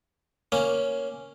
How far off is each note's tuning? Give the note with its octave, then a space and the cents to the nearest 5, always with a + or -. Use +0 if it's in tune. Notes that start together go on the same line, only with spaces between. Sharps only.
A#3 +0 C#4 +0